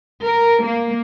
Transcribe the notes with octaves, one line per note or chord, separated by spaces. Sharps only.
A#4
A#3